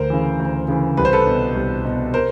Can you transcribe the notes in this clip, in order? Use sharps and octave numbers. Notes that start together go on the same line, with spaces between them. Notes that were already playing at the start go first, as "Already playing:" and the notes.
Already playing: D2 A#4 C5
C#3 E3
D2
C#3 E3
C2 B4
C5
A4 B4
B2
C2
B2
A#4 C5